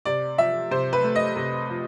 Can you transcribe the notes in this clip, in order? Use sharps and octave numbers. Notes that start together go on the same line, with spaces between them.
C3 D5
F3 E5
C3 C5
B4
A3
D#5
C3
F3